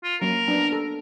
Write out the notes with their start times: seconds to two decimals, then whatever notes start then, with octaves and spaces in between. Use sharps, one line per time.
0.04 F4
0.22 F#3 A#3 C#4 A#4
0.48 F#3 B3 D4
0.72 A4